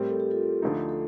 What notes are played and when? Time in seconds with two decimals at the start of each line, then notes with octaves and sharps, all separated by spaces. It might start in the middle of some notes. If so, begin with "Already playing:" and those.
Already playing: A2 G3 C4 G4 A#4
0.09 A4
0.20 G4
0.31 F4 A4
0.62 D2 D3 F3 A3 D#4
0.89 A4